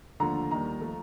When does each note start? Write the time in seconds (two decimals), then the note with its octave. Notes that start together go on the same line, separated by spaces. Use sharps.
0.20 D#2 D3 F3 A3 A#5
0.51 D#2 D#3 G3 A#5
0.81 F3 A3